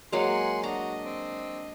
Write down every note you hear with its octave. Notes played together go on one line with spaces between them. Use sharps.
F#3 G#3 A#3 F#5 G#5 C6
D4 F#4 D#5 A#5
C4